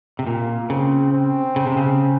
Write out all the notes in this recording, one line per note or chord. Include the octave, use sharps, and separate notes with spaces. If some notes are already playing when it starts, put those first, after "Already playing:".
C3
A#2 A#3
C#3 C4
C4
C#3
C3
C#3